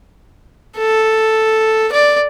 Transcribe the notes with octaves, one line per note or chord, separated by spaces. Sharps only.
A4
D5